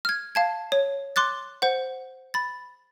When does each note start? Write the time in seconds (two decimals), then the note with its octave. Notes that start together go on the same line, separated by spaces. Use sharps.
0.05 F6 G#6
0.35 F5 A5 G#6
0.72 C#5
1.16 C6 D6 F#6 A6
1.62 C5 F#5
2.34 B5 A6